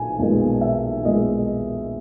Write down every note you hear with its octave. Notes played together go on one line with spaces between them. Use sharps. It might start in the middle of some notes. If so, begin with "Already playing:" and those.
Already playing: B1 A#2 B3 G#5
B1 A#2 G#3 B3
E5
B1 A#2 G#3 B3 D#5